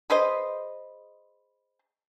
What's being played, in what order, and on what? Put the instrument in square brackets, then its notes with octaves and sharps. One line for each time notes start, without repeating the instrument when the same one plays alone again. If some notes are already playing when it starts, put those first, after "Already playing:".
[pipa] G#4 B4 C5 D#5